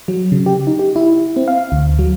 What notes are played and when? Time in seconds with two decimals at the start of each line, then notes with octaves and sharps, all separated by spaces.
0.08 F#3
0.32 C#3
0.46 G4
0.67 D#4
0.79 G4
0.96 E4
1.36 C4
1.48 F5
1.72 D2
1.99 F#3